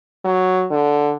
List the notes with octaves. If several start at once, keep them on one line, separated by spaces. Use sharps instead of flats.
F#3
D3